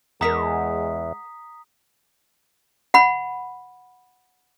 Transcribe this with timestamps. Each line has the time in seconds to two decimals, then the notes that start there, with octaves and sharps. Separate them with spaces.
0.21 E2 G#3 A#4 E5 F#5 A#5 D#6 B6
2.94 F#5 B5